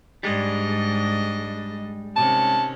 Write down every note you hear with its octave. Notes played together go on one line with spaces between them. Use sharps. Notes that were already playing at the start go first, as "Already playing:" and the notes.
G#2 G3 G#3 D4 D#5
C3 D#3 C#4 A5